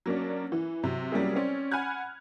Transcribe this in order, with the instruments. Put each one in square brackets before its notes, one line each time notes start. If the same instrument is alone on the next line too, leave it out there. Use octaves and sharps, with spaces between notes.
[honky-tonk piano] F#3 A#3 C#4 D4
E3
C3 F#3
F#3 G3 A#3 C#4 E4 G#4
C4 C#4 D5
F#5 G#5 B5 F6 F#6 G#6